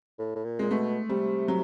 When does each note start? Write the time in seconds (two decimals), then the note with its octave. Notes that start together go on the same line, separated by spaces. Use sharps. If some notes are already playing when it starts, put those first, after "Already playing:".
0.19 A2
0.35 A2
0.45 A#2
0.59 A#2 G#3
0.71 B2 A3
1.09 C3 G3
1.48 F#3